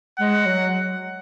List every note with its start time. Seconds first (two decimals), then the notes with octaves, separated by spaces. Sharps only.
0.18 G#3 F#5
0.45 F#3